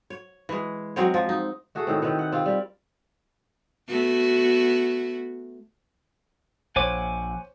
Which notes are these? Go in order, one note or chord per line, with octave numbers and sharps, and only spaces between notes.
C#5
E3 G#3
F#3 G#3 C4 C#5
F3
D#4
A3 F#4 G#4 A4
A2 D#3 C4
D#3 C4 B4 C#5
F#5
C4 F4 G4
G3 A#4
A3 B3 F#4
A#1 C5 C#5 F#5 G#5 D6